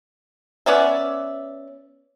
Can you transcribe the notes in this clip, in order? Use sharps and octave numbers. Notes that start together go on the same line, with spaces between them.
B3 C#4 D5 E5